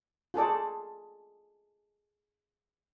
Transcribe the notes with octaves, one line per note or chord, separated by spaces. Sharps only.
F4 G#4 A4 D5